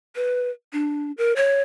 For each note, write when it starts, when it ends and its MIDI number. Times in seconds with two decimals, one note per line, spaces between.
0.16 0.50 71
0.73 1.12 62
1.18 1.33 70
1.36 1.62 73